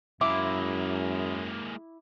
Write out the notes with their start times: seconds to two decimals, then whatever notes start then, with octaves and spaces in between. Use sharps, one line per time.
0.21 F#2 G#3 A#3 E4 D6